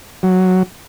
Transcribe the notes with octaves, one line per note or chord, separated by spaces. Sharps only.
F#3